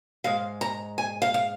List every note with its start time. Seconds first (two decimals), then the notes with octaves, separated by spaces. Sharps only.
0.24 G#2 G#3 F5
0.61 A#5
0.98 G#5
1.22 F5
1.34 F5